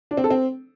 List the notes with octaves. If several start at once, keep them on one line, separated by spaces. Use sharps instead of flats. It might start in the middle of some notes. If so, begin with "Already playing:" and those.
D4
C4
A4
C4